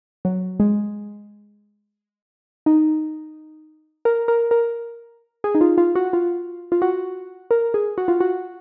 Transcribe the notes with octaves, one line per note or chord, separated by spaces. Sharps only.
F#3
G#3
D#4
A#4
A#4
A#4
G#4
D#4
F4
F4
F#4
F4
F4
F#4
A#4
G#4
F#4
F4
F#4